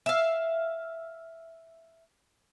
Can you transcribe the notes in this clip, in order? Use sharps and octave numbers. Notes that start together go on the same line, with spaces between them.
E5 F5